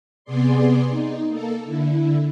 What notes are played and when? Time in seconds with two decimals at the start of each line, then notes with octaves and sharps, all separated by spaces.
0.25 C3 B3 G#4 D5 C6
0.89 D#4
1.29 A#3 A4
1.65 D3 E4